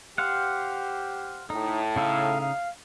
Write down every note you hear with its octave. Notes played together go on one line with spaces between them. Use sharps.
G4 C5 F5 F#5
A2 D#4
C#3 D#4 E5 F5
F5